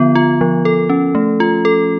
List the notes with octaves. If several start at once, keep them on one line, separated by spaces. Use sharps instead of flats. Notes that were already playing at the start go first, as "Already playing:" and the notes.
Already playing: D3 F3 B3 F4
F4
F3
A4
C#4
A3
F4
A4